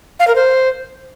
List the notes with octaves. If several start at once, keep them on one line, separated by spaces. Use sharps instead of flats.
F5
A#4
C5